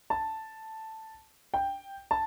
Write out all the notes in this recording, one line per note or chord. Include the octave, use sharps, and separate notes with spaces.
A5
G5
A5